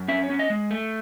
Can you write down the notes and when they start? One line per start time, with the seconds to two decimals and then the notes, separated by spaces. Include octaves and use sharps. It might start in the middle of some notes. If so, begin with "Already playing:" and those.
Already playing: F#2
0.08 C#4 E5
0.23 C#5
0.30 C#4
0.39 D#5
0.50 G#3
0.71 A3